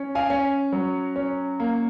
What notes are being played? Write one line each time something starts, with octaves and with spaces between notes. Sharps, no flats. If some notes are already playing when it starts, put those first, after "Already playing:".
Already playing: C#4
F5 G#5
C#4
F#3
C#4
A#3